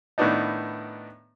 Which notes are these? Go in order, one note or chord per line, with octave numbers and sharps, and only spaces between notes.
A2 D#3 B3 D4 D#4